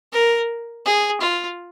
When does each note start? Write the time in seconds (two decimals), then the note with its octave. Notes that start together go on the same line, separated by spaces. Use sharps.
0.13 A#4
0.85 G#4
1.21 F4